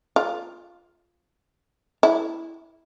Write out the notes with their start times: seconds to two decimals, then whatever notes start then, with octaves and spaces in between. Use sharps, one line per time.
0.16 F4
2.03 E4